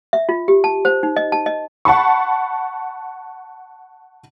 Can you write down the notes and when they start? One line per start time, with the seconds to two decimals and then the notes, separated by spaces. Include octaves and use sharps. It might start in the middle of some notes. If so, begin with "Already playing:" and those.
0.13 E5
0.29 F4
0.48 G4
0.64 A5
0.85 C5
1.03 D#4
1.17 D#5
1.32 A5
1.46 D#5
1.85 F#5 A5 B5 C#6